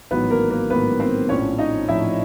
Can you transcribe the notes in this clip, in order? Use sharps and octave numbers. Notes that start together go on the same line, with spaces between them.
A1 G#2 D#3 F#3 B3 B4
A#3 A#4
A#3 A#4
A1 G#2 D#3 F#3 B3 B4
C4 C5
A#1 A2 F3 C#4 C#5
D#4 D#5
A#1 A2 F3 E4 E5